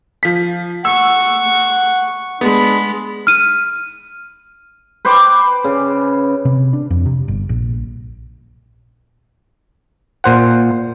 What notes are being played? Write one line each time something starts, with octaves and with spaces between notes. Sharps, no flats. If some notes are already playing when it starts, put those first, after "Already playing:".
F3 B6
F#5 C#6 E6
G#3 B3 D4 B5
F6 D#7
B4 C5 G5 D6
C#3
C3
D4
F2
C3
G1
A#1
A#2 C5 F#5